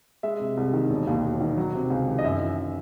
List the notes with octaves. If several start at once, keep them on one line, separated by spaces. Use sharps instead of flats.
G#3 E5
C3
C2
D#3
E1
D#2
E1
D#3
F#3
C3
C#2
D#3
D#5
F#2 E5
E3